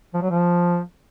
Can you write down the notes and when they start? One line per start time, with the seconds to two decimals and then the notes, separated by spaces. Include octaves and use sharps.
0.14 F3
0.22 F#3
0.30 F3